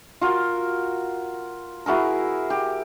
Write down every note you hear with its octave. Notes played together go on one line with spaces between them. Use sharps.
F4 F#4 A#4
E4 F#4 G#4 A#4
G4